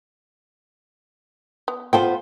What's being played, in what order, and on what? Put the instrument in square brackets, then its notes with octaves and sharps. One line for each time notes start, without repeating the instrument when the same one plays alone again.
[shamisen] B3
[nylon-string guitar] B3 F4 C5 [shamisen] A4 G5